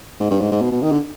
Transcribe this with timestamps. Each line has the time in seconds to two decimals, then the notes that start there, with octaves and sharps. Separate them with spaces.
0.20 G#2
0.31 G2
0.41 G#2
0.52 G#2
0.62 B2
0.72 B2
0.83 D#3
0.92 D3